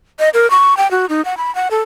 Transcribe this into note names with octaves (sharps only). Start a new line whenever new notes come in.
D#5
A#4
C#6
G5
F#4
D#4
F#5
B5
F#5
A4